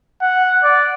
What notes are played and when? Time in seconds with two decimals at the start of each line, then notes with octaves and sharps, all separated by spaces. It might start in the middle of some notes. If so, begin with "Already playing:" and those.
0.21 F#5
0.63 D5